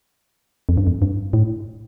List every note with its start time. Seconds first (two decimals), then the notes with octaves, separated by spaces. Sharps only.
0.69 F2
0.77 G2
0.87 F2
1.02 G2
1.33 A2